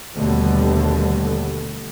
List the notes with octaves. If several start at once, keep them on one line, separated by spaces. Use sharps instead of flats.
D#2 B2 D3 G3 A3